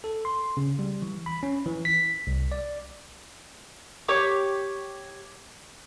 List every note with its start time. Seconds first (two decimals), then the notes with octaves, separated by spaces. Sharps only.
0.04 A4
0.25 C6
0.57 C#3
0.79 G3
1.02 E3
1.26 B5
1.43 C#4
1.66 E3
1.85 B6
2.27 C2
2.52 D5
4.08 G4 C#5 C#6 D6